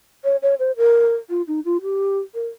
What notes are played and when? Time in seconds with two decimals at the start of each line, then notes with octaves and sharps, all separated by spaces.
0.24 C#5
0.43 C#5
0.59 C5
0.77 A#4
1.30 F4
1.48 D#4
1.65 F4
1.82 G4
2.34 A#4